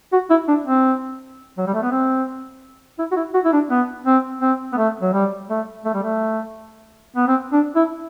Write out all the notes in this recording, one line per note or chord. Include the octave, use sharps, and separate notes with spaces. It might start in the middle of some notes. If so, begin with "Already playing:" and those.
F#4
E4
D4
C4
F#3
G3
A3
B3
C4
E4
F#4
E4
F#4
E4
D4
B3
C4
C4
B3
A3
F#3
G3
A3
A3
G3
A3
B3
C4
D4
E4